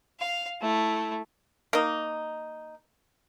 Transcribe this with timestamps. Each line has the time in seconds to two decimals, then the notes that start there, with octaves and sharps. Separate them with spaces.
0.19 F5
0.61 A3 E4
1.73 A#3 D#4